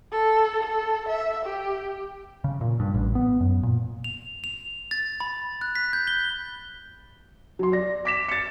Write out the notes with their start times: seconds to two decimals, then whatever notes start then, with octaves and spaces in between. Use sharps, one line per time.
0.12 A4
0.63 A4
1.09 E5
1.45 G4
2.44 C#3
2.61 A#2
2.80 G2
2.94 A1
3.15 B3
3.41 F#2
3.63 A#2
4.04 F7
4.44 F7
4.91 A6
5.20 B5
5.61 F#6
5.75 B6
5.93 G6
6.07 G7
7.59 F#3 C6
7.72 D5 A#6
8.05 D6 B6 E7
8.29 A6 C#7